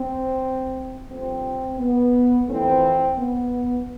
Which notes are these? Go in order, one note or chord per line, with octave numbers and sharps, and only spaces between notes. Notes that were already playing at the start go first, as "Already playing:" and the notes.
Already playing: C4
G2 F3 A3 C4
B3
F2 E3 A3 C4
B3